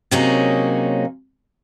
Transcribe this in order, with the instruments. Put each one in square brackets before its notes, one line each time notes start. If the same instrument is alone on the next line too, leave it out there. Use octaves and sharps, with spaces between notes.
[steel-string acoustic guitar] C3 F#3 A#3 C#4 D#4 G#4